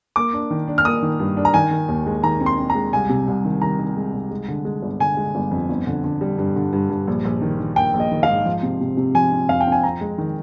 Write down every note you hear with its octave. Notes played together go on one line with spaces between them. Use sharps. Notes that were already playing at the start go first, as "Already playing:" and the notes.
A#3 D6
D4
D#3
D4
F6
A#3 D#6
D#3
G2
D4
A#5
D#3 G#5
D#3
D#2
G#3
D#3 A#5
C4
C6
C4
A#5
G#3
C2 G#5
C3
C2
D#3
D#3 A#5
D#3
G#3
C2
G#3
D3
G#3
G1
D3 G#5
G#3
G1
F2
G1
D3
D3
G3
G2
D3
G2
G2
A#1
A#1
D#3
D#3
A#3 G5
A#1
D#5
D#3
F5
G#2
F3
C3
C3
C3
F3 G#5
C4
F2 F5
G5
C4
G#5
F2 A#5
G#3
D#3